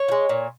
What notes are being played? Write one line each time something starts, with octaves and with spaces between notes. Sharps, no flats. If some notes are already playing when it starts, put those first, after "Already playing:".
Already playing: C#5
F3
G#3
A#2